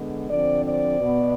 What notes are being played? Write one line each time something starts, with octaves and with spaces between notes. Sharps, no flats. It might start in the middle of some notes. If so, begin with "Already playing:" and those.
Already playing: D3 G#3 B3
D3 F3 C4 D5
D5
B2 B3